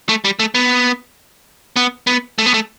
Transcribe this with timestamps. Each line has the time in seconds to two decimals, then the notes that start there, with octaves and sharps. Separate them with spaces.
0.09 A3
0.25 G3
0.39 A3
0.55 B3
1.76 B3
2.07 B3
2.38 A3
2.46 B3
2.54 A3